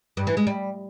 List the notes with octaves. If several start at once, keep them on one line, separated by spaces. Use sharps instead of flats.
G2
E3
G#3
G3